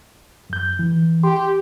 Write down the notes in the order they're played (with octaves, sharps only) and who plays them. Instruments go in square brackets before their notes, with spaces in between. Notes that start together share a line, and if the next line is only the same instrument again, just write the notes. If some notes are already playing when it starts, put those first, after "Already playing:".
[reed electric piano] F#2 G6
E3
[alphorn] G4 [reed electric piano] C6